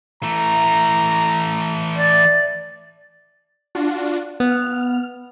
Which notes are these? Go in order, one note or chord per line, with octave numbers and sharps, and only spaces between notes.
E3 A3 A#5
D5
D4 F4 F#4
B3 F6